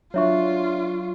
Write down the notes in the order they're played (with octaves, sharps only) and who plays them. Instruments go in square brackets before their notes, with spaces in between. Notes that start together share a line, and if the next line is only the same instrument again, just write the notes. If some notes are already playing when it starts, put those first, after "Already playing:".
[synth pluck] F#3 D4 [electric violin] F4 [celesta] C#5 E5 C#6